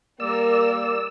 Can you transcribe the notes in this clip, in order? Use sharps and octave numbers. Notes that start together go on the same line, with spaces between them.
G3 A#3 A#4 D5 E6